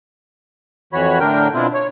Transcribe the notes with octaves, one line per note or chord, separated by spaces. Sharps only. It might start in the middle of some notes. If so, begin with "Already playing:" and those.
F2 E3 F#4 C#5 B5
A2 D3 D4 A#4 G5
B2 C4 D4 E4 F4
C#5